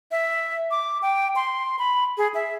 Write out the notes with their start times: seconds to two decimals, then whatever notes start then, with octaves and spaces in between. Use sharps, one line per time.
0.11 E5
0.71 D6
1.02 G5
1.36 C6
1.79 B5
2.18 G#4
2.34 E5